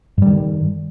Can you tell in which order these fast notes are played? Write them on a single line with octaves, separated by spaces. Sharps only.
G2 G3 D#3